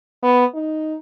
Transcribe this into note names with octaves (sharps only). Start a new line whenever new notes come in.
B3
D#4